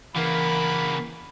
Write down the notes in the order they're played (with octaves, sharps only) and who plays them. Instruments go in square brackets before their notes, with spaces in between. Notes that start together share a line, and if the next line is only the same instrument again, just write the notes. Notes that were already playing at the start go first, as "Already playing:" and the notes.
[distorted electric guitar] C#3 A#3 [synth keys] E3 [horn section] A#4 F#5 B5